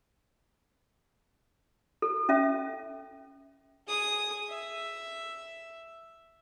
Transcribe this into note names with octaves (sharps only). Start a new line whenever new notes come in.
A4
C#4 E5
G#4 D#6
E5